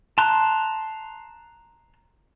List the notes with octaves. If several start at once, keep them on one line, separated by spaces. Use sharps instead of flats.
A5 A#5 C6 F#6